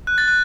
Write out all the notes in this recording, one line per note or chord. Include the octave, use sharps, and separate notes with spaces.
F#6
A6
F#6